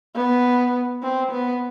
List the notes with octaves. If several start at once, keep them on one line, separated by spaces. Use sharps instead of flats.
B3
C4
B3